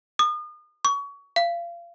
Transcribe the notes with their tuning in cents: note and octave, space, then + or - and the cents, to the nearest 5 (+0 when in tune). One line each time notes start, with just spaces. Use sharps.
D#6 -40
C#6 +25
F5 -30